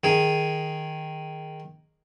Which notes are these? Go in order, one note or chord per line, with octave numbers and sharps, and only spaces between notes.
D#3 G#4